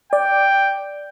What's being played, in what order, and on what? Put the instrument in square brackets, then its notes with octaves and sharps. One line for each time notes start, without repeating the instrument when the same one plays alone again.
[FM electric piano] D5 [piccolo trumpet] G5